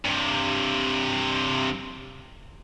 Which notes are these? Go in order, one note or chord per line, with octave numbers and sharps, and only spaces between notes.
G2 C3